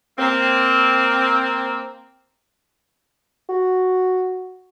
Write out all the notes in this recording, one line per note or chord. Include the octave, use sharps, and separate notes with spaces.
A#3 C4
F#4